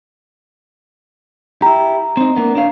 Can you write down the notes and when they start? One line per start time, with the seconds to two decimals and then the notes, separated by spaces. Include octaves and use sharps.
1.62 E4 G4 A#5
2.17 C4 D#4
2.35 A#3 B3 D4
2.55 D4 C#5 F5